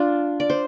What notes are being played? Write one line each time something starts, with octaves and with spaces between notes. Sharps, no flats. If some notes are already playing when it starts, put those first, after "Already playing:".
Already playing: D4 F4
D5
C5